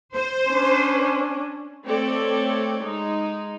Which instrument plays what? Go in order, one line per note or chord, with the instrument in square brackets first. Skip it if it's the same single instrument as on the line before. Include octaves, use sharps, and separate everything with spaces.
[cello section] C5
[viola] C#4 D4
[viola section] A3 C4 A4 C#5 D5
G#3 D#4